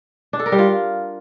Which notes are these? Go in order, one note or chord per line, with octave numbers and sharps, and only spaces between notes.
D4
A4
A#4
G3
F4